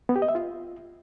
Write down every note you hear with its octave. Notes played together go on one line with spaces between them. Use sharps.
B3
G4
D#5
E5
F4